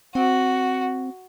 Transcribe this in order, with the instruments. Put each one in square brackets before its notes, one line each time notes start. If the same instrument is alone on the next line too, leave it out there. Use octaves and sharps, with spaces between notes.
[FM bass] C4 [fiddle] F#4